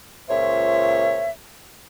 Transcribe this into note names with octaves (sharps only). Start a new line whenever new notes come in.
C#2 A#2 C5 C#5 E5